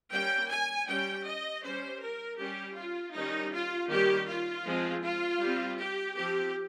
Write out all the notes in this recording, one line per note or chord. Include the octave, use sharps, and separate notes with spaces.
G3 A#3 C#4 G5
G#5
G3 C#4 G5
D#5
G3 C#4 C5
A#4
G3 C#4 G4
F4
D#3 G3 C#4 D#4
F4
D#3 G3 A#3 C#4 G4
F4
F3 G#3 C4
F4
G3 C4
G4
F3 C4 G4